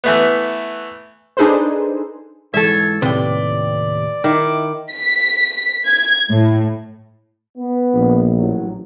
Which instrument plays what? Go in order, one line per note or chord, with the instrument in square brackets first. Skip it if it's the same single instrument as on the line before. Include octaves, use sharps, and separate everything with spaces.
[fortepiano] E3 A3 B3
[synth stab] D4 D#4 G#4 A4 B4 C5
[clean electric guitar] G#2 E3 [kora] A4 E5 [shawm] C#5
[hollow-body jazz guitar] D#2 A2 C3 [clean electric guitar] B4 G5 [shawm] D5
[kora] D#3 [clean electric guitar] E4 E5 [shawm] D6
[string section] B6
G#6
A2
[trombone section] B3
[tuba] A#1
[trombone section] A1 F#3